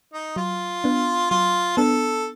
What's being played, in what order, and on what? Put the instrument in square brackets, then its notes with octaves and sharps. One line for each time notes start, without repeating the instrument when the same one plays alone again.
[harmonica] D#4
[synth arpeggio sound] F#3 [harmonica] F4
[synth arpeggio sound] B3 D4
[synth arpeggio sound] F#3 [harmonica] F4
[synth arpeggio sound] B3 D4 [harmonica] A4